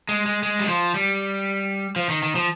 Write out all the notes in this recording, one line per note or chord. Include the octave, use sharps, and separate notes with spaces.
G#3
G#3
G#3
G3
F3
G3
F3
D#3
D#3
F3